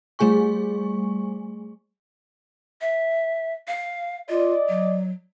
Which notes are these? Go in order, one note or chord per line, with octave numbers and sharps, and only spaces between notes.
G3 A3 G#4 G#5 C#6
E5
F5
F4 D5 D#5
F#3